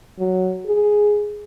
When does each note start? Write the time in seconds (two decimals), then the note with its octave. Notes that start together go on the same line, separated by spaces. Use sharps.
0.19 F#3
0.66 G#4